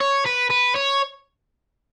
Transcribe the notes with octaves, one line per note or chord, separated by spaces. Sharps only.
C#5
B4
B4
C#5